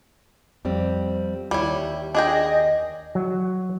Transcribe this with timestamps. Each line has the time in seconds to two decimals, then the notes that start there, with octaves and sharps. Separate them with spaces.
0.65 F2 G3 C4
1.51 D#2 G3 E4 C#5
2.15 D4 G#4 D#5 G5
3.15 F#3